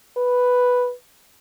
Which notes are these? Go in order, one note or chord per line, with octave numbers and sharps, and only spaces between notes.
B4